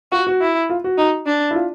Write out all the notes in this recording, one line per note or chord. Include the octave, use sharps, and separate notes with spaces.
F4 F#4
F#4
E4
F4
F#4
D#4
D4
E4
F4